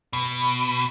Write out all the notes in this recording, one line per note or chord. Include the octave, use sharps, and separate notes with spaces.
B2